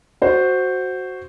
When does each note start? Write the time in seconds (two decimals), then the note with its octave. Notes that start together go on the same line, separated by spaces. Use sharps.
0.22 F#4 C5